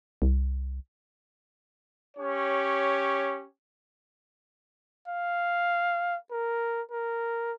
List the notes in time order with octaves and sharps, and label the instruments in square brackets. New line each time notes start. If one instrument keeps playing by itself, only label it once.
[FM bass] C2
[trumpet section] C#4 G4 C#5
[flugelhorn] F5
A#4
A#4